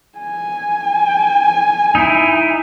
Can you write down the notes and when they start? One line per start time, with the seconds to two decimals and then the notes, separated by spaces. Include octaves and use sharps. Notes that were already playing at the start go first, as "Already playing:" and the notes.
0.19 G#5
1.95 D#4 E4